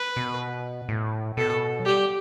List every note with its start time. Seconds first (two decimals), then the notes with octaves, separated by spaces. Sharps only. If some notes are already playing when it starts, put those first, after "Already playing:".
Already playing: B4
0.16 B2
0.89 A2
1.37 B2 A4
1.80 F#3
1.86 G3 G4